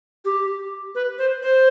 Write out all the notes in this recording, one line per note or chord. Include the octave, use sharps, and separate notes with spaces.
G4
B4
C5
C5